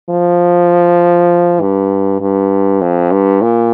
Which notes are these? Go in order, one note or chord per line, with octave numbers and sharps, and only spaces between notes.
F3
G2
G2
F2
G2
A#2